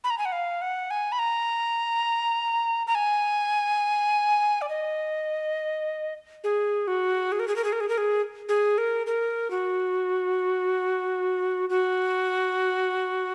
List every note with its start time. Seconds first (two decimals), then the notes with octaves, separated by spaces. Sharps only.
0.04 B5
0.10 A#5
0.18 G#5
0.25 F#5
0.32 F5
0.62 F#5
0.91 G#5
1.12 B5
1.19 A#5
2.87 A#5
2.95 G#5
4.62 D5
4.69 D#5
6.44 G#4
6.88 F#4
7.32 G#4
7.39 A#4
7.48 G#4
7.56 A#4
7.64 G#4
7.72 A#4
7.80 G#4
7.89 A#4
7.98 G#4
8.49 G#4
8.78 A#4
9.07 A#4
9.51 F#4
11.70 F#4